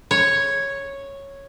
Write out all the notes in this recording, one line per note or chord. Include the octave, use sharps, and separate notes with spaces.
C#5